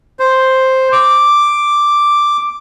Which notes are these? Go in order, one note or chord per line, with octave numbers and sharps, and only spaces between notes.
C5
D6